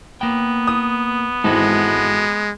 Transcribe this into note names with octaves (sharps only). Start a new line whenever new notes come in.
A#3 B3 G5
D#6
G#1 E3 G#3 E4 F#4 A4